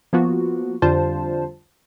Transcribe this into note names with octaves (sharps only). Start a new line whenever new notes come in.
F3 A#3 B3 F4 F#4
F2 D3 G3 F4 C5 A5